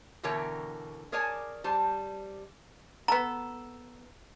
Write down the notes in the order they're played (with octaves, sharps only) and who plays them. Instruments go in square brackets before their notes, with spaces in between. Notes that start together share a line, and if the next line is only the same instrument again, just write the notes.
[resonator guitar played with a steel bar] B2 D3 E3 A#4 C#5 G5
G#4 A#4 C#5 D5 G#5 A5
G3 C5 A5
[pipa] B3 A4 [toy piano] A#5